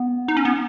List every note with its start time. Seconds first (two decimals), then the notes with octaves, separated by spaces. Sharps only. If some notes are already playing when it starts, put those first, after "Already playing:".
Already playing: B3
0.28 D#4
0.37 C#4
0.45 B3